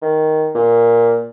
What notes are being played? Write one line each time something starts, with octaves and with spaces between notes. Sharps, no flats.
D#3
A#2